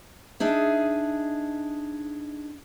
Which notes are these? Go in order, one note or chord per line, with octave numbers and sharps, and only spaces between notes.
D4 D#4 G#4 E5